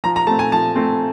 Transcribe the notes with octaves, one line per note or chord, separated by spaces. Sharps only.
F3 A#5
A#5
A3 C4 A5
G#5
F3 A5
A3 C4